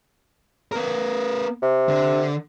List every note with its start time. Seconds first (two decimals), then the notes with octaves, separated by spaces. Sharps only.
0.72 B3 A#4
1.62 C3
1.89 D3